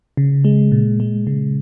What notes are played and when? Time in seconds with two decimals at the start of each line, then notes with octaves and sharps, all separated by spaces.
0.17 C#3
0.44 G#3
0.72 A#2
1.00 G#3
1.27 C#3